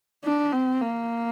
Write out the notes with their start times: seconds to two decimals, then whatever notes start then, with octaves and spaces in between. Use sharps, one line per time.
0.24 D4
0.52 C4
0.81 A#3